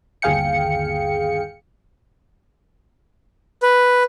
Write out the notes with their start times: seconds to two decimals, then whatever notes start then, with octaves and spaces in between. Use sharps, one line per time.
0.22 G1 D#2 G#4 F5 G5 C#7
3.63 B4